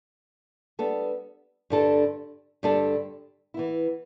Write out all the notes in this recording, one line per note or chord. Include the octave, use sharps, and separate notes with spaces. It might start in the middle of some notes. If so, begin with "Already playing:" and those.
G3 B3 D4 A4
G2 D3 G3 D4 A4
G2 D3 G3 D4 A4
E3 B3 E4